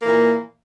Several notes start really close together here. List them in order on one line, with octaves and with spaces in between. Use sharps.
A#3 E3 A#2